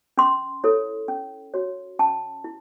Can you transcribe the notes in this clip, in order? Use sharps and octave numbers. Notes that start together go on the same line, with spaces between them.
C#4 C6
E4 A4 C#5
C#4
F#4 C#5
C#4 A5
E4